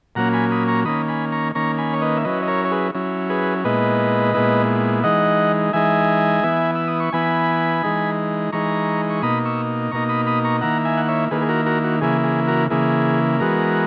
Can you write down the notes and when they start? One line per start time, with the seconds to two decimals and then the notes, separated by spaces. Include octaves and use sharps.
0.15 A#2 F#3 A#3 C#4 F#5 A#5
0.33 G#5 B5
0.51 B5 D#6
0.68 A#5 C#6
0.85 D#3 A#3 C#4 B5 D#6
1.08 G#5 B5
1.32 A#5 C#6
1.55 D#3 A#3 C#4 A#5 C#6
1.78 G#5 B5
1.94 C#5
2.01 B4 D#5
2.17 E5
2.25 F#3 C#4 E4 B4 D#5
2.42 D#5
2.48 A#4 C#5
2.65 C#5
2.71 G#4 B4
2.95 F#3 C#4 E4
3.30 G#4 B4
3.64 A#2 G#3 B3 E4 B4 D#5
4.34 A#2 G#3 B3 E4
5.03 E3 G#3 D#4 D#5 F#5
5.73 E3 G#3 D#4 E5 G#5
6.43 E3 B3 E4
6.75 E6
6.88 D#6
7.00 C#6
7.13 E3 B3 E4 G#5 B5
7.83 E3 G#3 D#4
8.52 E3 G#3 D#4 A#5 C#6
9.10 C#6
9.22 B2 A#3 D#4 B5 D#6
9.45 C#6 E6
9.91 B2 A#3 D#4 A#5 C#6
10.09 B5 D#6
10.27 B5 D#6
10.44 A#5 C#6
10.61 D#3 A#3 E4 F#5 A#5
10.85 E5 G#5
10.97 F#5
11.08 C#5 E5
11.31 D#3 A#3 E4 G#4 B4
11.41 G#4
11.49 F#4 A#4
11.66 F#4 A#4
11.84 F#4
12.01 C#3 E3 A#3 E4 G#4
12.24 G#4
12.47 F#4 A#4
12.70 C#3 E3 A#3 E4 G#4
13.40 E3 G#3 B3 F#4 A#4